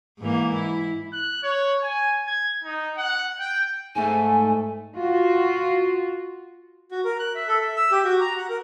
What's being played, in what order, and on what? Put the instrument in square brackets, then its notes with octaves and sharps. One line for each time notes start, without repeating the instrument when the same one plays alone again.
[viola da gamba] G#2 E3 A#3
E4
[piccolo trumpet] F#6
C#5
G#5
G#6
D#4
F#5
G5
[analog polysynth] G#2 A3 [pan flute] G#5
[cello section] F4 F#4
[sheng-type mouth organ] F#4
A#4
F#6
E5
A4
E5
E6
G4
F#4
A#5
F#5
A#4